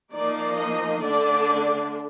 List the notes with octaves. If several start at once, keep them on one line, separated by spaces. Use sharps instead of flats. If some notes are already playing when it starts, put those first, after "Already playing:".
F3 A#3 D#4 D5
D#5
D3 A3 D4 D5